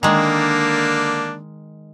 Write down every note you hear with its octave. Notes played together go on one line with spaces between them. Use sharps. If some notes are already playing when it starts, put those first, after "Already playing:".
D3 D#3 G#3 A#3 D4